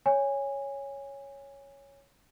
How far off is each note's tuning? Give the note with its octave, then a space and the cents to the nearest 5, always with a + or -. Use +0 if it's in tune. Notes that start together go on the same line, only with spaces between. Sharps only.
C#5 +0 G#5 -15